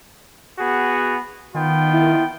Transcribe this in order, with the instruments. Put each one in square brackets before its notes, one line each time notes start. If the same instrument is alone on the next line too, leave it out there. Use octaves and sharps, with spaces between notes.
[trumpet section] B3 F#4 G#4
[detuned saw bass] D#3 [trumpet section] B3 F4 G5
[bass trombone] E4